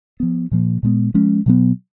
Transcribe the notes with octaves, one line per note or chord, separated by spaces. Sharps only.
F3 B3
A#2 F3 A#3
A#2 G#3 B3
F3 G#3 C#4
B2 F#3 B3